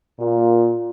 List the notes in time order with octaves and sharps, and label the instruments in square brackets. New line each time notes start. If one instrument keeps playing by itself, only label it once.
[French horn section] A#2 A#3 F4